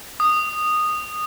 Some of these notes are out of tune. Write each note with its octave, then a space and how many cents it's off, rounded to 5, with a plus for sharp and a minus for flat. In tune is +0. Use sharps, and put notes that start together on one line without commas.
D#6 -15